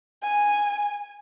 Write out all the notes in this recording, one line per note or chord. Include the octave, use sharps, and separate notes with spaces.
G#5